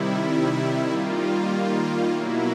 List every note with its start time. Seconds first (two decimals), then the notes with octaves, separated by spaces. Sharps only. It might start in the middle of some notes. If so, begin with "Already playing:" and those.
Already playing: C3 D#3 G3 E4
0.86 D#3 G3 A#3 F4
1.47 F4
2.09 B2 F#3 A#3 E4